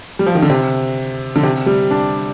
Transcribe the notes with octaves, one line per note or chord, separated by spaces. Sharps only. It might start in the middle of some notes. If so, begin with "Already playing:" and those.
G3
F3
D#3
D3
C3
D3
C3
G3
D4